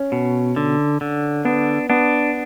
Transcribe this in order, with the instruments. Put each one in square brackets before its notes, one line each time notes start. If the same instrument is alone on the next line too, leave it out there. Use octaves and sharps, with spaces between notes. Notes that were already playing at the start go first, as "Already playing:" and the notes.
Already playing: [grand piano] C#4
[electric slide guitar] B2
D3
D3
[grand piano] B3 [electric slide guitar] D4
[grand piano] B3 [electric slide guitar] D4